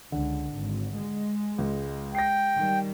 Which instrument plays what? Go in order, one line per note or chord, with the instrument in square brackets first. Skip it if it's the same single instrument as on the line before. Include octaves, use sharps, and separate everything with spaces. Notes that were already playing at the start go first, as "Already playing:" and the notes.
[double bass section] C#2 [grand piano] D3
[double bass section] G#1
G#3
[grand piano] C#2
[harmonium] G5 [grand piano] A#6 C7
[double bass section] D#3 G3